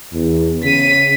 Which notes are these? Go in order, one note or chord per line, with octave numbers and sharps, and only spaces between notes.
E2
C#3 B6 D#7